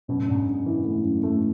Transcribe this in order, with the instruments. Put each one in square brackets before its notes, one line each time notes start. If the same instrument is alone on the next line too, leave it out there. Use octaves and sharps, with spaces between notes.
[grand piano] F#2 [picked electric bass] B2
[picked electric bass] A2
[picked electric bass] G#2 B2 [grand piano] D4
[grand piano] D4
E3
A3
F#2
A3